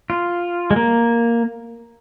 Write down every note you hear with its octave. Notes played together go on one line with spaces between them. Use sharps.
F4
G#3
A#3